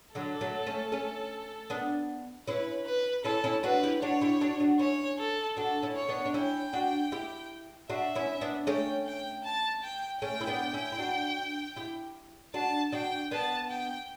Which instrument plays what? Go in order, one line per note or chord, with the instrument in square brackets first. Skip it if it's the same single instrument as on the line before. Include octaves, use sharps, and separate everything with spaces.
[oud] D3 F#3 [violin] A4
[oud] F#3 A3
A3 C#4
A3 C#4
B3 D4
[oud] C#4 E4 [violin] B4
[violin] B4
[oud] C#4 E4 [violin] A4
[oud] C#4 E4
[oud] D4 F#4 [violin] B4
[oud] E4 G4
[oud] D4 F#4 [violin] C#5
[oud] E4 G4
D4 F#4
D4 F#4
[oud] C#4 E4 [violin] C#5
[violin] A4
[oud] D4 F#4 [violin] A4
[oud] C#4 E4
[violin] C#5
[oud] B3 D4
D4
[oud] C#4 E4 [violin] G5
[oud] D4 F#4
E4 G4
[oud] D4 F#4 [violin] E5
[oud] C#4 E4
B3 D4
[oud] A3 C#4 [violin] G5
[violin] G5
A5
G5
[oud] A3 C#4 [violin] G5
[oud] E4
B3 D4
C#4 E4
E4
D4 F#4
E4 G4
[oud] D4 F#4 [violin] A5
[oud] D4 F#4 [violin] G5
[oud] B3 D4 [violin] A5
[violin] G5